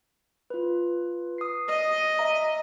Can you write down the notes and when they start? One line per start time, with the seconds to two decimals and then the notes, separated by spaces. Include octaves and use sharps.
0.50 F4 B4
1.38 D#6 C7
1.69 D#5
2.19 D5 E5 A#5